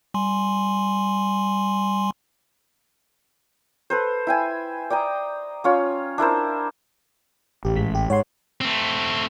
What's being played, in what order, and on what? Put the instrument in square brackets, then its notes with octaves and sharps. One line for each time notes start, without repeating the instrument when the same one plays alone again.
[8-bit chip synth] G3 G#5 C6
[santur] A4 B4 C5
E4 G5 G#5
D5 G5 A#5 D#6
C#4 F4 C#5
D4 E4 A#4 C5
[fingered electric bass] A1 [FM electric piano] G4
[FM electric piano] G#1 G#3 B6
G4
[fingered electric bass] G#2 [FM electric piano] C#5 F#5 C6
[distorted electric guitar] A3 C4